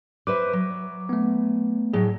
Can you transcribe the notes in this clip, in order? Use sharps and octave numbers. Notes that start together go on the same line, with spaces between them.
B4 C5 E5 D6
F#3
A3 B3
A2 F#3 G#4